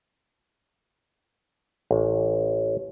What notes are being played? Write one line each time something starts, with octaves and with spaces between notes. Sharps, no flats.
A1